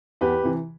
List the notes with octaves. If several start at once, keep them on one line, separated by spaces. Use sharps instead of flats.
E2 G4 B4
C3 E3